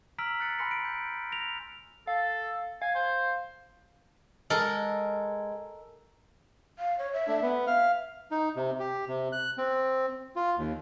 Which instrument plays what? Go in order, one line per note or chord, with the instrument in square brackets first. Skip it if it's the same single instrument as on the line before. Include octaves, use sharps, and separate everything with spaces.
[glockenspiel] A#5 E6 F6 B6 D7 F#7
F6 F#6 A6 C#7
G#5 B5 C6 F#6 A#6 C#7
D7
G6
A#6 D7 F7
[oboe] A4 [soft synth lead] F5
[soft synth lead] F5 [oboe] G#5
[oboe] C5
[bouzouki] G#3 [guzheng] A4 A#4
[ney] F5
C#5
E5
[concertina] A3 D4
B3
[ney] E5 [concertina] F5
[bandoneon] D#4
C3
G4
C3
F#6
C4
F4
D#2